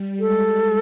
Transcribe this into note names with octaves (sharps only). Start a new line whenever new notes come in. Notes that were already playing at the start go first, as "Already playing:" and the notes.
Already playing: G3
G#3 A4